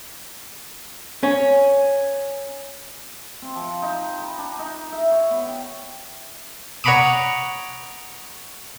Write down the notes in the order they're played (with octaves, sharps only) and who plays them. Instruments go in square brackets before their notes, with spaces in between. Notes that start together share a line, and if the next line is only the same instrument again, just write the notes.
[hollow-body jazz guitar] C#4
[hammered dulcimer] C4
F3
D#4
B5
D4
D#4
E5
C#5
B3
G5
[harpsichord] C#5 F#5 A#5 B5 D6 D#6